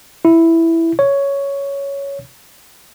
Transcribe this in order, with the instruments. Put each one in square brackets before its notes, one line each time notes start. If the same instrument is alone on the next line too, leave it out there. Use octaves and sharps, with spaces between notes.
[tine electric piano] E4
C#5